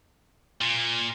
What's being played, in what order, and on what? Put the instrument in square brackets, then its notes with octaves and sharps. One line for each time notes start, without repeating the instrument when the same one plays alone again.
[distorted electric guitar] A#2